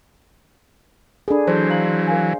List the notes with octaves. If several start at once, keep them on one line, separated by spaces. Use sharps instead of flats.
D4 G#4 A4 B5
E3 F#3 C5
F5 A#5 F#7
A#4 F5 G#5